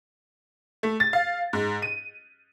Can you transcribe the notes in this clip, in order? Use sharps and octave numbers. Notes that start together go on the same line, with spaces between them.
A3
A6
F5
G#2
D#7